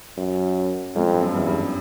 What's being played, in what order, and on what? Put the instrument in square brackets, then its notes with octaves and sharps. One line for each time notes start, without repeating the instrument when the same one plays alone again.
[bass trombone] F#2
[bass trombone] F2 [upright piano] G#2
[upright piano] G2
F#2
[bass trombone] E2 [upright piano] G2
[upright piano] G2